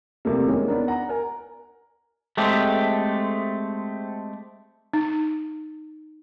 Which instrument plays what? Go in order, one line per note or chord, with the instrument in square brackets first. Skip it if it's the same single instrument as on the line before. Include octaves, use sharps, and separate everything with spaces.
[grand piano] C2 C3 G3 A3 A#3
D#3 G#3 A#3 C#4
B3 D4 A#4
F#5 A#5
A#4 G#5
[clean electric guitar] G#3 A3 C4 G4
[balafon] D#4